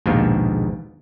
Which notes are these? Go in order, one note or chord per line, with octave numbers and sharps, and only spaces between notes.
A#1 D#2 G#2 B2 F5